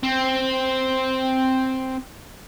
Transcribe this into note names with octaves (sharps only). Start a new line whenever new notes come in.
C4